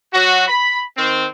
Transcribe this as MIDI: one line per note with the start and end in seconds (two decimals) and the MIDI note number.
0.12 0.44 54
0.12 0.44 66
0.47 0.80 83
0.96 1.25 51
0.96 1.25 60